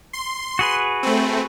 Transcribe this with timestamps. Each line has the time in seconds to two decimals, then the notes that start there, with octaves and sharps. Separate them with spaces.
0.13 C6
0.59 F#4 G#4 B4
1.03 A3 C4